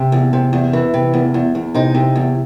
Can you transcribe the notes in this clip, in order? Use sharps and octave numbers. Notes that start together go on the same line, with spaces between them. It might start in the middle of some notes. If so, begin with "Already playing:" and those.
Already playing: C3
E2
C3
E2
E3
C3
E2
E2
E2
C3 D#4
C3
E2